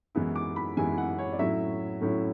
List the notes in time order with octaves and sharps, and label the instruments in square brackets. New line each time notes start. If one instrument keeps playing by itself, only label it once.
[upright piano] F#2 E3 G#3 B3 E4
D6
B5
F#2 E3 G#3 B3 E4 G#5
F#5
C#5
D5
A2 F#3 C#4 E4 E5
A2 F#3 C#4 E4